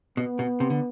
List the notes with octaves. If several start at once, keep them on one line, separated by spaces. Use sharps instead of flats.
B2 B3
B2
C3
D3